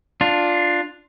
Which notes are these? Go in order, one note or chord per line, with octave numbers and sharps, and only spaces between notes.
D4 F4